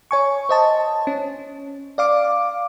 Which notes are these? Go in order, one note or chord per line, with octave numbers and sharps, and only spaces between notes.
C#5 G#5 C#6
C5 D#5 A5
C#4
D5 F5 D6